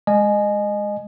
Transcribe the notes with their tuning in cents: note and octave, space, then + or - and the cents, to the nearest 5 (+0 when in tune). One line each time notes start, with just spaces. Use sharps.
G#3 +0 D#5 -25 G#5 +15